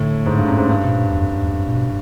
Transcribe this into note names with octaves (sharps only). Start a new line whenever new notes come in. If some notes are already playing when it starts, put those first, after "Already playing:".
Already playing: A2 D3
G#2
G2
F#2
G#2
G2
B2
A#2
E2
F2
F#2
E2
F2
A#2
B2